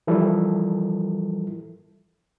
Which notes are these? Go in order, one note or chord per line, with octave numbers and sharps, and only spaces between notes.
E3 F3 G3 E4 A4 A#4